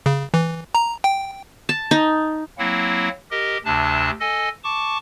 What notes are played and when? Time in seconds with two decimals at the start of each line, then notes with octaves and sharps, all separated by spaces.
0.06 C#3
0.34 E3
0.75 A#5
1.04 G5
1.69 A5
1.91 D#4
2.58 F#3 A#3 C4 E4 F#5
3.31 G4 A#4 D#5
3.65 D2 C3 D4 A5
4.20 A4 D#5 G#5
4.64 A5 C#6 D6